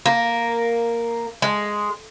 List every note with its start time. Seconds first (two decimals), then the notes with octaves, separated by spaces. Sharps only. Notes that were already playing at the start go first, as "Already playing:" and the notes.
0.06 A#3
1.42 G#3